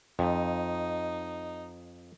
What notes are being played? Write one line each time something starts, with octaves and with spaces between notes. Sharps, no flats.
F2 D#4